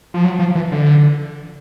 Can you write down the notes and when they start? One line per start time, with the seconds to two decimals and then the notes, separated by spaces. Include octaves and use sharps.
0.14 F3
0.24 F#3
0.39 F3
0.55 E3
0.72 D3